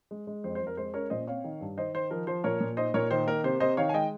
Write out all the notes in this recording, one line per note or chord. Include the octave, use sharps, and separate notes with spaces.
G#3
G#3
F2 C5
C5
F2
A#4
G#3 C5
C#4 A#4 C#5
A#2 C5 D#5
C4 C#5 F5
D#3
G2
D#3 C5 D#5
D#3 C5
F3 A#4
F3 C5
A#2 A#4 C#5
A#2
D#4 C5 D#5
A#2 A#4 C#5
D#3 C5
A#3 A#4
C3 C5
C3 C5 D#5
D#3 C#5 F5
G#5
G#3 D#5 G5